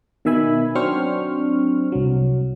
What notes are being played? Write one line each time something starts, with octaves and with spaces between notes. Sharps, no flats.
B2 D#3 E5 G#5 B5
F#3 C4 D4 C5 C#6 F6
C2 F#3